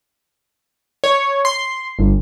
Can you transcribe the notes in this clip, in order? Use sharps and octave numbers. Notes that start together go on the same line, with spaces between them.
C#5
C6
G1